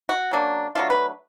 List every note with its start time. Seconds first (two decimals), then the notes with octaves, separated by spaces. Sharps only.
0.09 F#4
0.31 C#3 F#3 A#3 D4
0.75 F#3 A3 D4 F4
0.90 B4